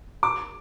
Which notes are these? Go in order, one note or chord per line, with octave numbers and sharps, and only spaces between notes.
D6